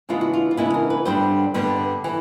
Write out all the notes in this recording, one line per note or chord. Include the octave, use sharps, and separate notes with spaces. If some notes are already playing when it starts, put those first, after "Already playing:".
C#3 E3 G#3 B3 D4 F4
F#4
F4
F4
C#3 E3 G#3 B3 D4 E4
A#4
B4
G2 D3 G3 B3 D4 C5
G2 D3 G3 B3 D4
E3